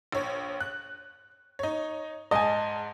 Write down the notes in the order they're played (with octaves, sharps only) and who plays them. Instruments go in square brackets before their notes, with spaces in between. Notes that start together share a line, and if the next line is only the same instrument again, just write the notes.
[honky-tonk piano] A#1 C#5
F#6
D#4 C#5
[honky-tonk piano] G#2 A5 [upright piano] D#5 G#5